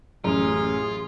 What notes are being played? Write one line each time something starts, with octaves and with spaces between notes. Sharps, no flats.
A1 F#2 F4 G#4